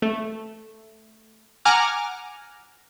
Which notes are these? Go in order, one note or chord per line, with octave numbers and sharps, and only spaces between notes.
A3
F#5 G#5 A#5 D6 F6